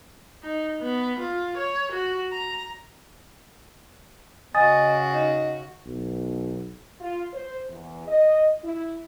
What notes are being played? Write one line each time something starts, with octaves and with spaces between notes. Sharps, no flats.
D#4
B3
F4
C#5
F#4
A#5
C#3 F#4 D#5 G#5 D#6 A6
D#4
B1
F4
C5
E2
D#5
E4